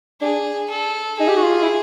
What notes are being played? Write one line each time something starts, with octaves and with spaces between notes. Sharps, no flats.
D4 G#4
A4
D#4 G#4
G4
F#4
F4
E4